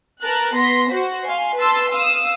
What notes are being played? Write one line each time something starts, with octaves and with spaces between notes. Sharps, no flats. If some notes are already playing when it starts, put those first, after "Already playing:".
A#4 B4 A5 F#6
B3 C6 A#6 B6
F#4 C5
F5 G#5 C6
B4 A5 C6 E6
F5 D#6 E6